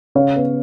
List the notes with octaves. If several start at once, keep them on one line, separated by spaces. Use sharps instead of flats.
C#3 C#5 F5
B3